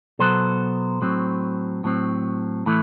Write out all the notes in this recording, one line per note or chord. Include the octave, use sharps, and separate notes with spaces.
B2 F#3 B3 A4 C5
A2 F#3 C4
A2 F#3 C4
A2 E3 A3